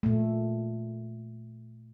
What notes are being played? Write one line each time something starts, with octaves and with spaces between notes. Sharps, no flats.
A#2 A3